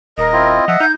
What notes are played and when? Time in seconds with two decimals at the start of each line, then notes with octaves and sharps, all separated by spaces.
0.18 D#1 A#4 D#5
0.33 C4 E4 F4
0.68 F3 E5 F#5
0.80 D#4 G6